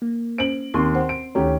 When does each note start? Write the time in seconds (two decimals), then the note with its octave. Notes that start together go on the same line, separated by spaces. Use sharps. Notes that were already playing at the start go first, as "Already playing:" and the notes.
0.02 A#3
0.38 C#4 C5 D7 F#7
0.74 D#2 C4 C6 C#6
0.95 C5 F#5
1.09 D7
1.35 D2 D#3 E3 A3 C#4 G4 C#5 A#5